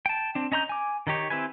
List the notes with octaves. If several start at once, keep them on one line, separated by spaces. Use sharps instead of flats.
G5 A5
C4 D4
C#4 D#5 A#5 C6 G6
G#5 D6
D#3 D#4 G4 C#5
C4 E4 G4 B4 G#5